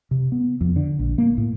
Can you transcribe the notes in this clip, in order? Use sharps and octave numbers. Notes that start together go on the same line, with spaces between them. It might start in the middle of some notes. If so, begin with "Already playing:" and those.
C3
B3
F2
D3
A#1
A#3
A2